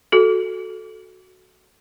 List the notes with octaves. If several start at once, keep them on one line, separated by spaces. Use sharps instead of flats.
F#4 A4